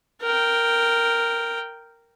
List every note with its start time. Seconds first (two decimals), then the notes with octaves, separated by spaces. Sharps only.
0.21 A#4 G5